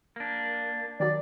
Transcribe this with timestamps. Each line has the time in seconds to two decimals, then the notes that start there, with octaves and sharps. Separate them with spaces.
0.16 A#3 D4
1.00 D#3 F#3 D5